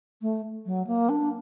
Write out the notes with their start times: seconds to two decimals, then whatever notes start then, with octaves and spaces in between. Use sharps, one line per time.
0.22 A3
0.66 F#3
0.87 A#3
1.09 D4